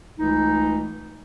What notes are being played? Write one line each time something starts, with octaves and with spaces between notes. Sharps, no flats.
C#2 E3 A3 D#4